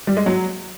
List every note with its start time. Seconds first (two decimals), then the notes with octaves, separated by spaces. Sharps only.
0.07 G3
0.17 G#3
0.26 F#3